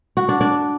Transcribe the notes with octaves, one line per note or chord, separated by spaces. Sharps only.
F#4
D4
D4